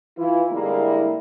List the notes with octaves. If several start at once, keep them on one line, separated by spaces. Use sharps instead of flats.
E3 E4 F4
D3 G3 G#3 A#3 E4